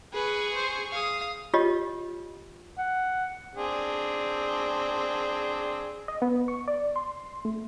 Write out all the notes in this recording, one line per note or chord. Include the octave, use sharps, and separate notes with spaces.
G#4 B4 C#6
C5
F5 D#6
F4 G4 C#5 D#5
F#5
C4 D4 G#4
D#5
B3
C#6
D5
C6
A3